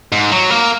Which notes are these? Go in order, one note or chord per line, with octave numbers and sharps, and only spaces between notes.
G#2
F#3
A#3